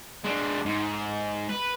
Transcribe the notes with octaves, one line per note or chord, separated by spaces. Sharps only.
G#3 D4
G#2
B4